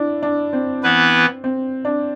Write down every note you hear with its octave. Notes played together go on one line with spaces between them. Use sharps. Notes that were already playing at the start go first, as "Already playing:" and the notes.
Already playing: D4 E4
D4
C4
E3 B3 E4 B4
C4
D4